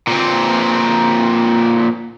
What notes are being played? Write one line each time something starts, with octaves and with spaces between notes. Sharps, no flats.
A#2 C4